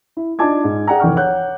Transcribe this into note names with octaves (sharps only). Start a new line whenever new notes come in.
E4
D4 D#4 F4 A5 D6 G#6
G#2
G#4 D5 F#5 G5 A#5
F1 E3 G5 C#6 F6
C#5 F#5 F#6 G6